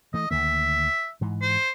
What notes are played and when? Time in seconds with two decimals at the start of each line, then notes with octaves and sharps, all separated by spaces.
0.14 E3 A3 D#5
0.31 D2 D#3 A#3 E5
1.21 G#2 E3
1.42 C5